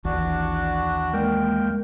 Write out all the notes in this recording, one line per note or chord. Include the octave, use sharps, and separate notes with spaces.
A1 D#2 E3 D4 F#4
G#3 A#3 A#4 G5